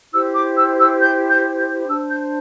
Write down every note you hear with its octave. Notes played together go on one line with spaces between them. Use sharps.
E4 G4 C5 E6
D6
E6
E6
G6
G6
G6
D4 C5 E6
G6